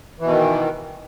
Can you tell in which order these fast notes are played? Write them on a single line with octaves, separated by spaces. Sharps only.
E3 B2 D#3